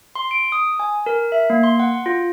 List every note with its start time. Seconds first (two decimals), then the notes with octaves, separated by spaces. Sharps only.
0.15 C6
0.31 D7
0.52 D#6
0.80 G#5
1.06 A#4
1.32 E5
1.50 A#3
1.63 C6
1.79 F#5
2.06 F4